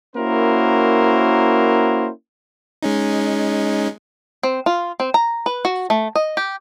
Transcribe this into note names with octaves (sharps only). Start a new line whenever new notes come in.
A#3 C#4 E4 F#4 A#4 C5
G#3 C#4 D#4
C4
F4
C4
A#5
B4
F#4
A3
D#5
G4